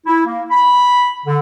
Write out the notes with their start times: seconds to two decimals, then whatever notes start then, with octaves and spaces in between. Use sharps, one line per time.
0.06 E4
0.25 A#3
0.50 B5
1.26 D3